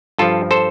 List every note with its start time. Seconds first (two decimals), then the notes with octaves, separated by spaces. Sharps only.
0.18 G2 F3 F4 A4
0.51 A4 C5